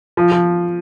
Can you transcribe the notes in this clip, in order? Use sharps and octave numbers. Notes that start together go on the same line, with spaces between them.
F3
F3